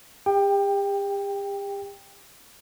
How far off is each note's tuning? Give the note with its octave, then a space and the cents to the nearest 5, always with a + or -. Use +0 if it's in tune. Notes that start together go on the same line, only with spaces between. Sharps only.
G4 +40 G5 +15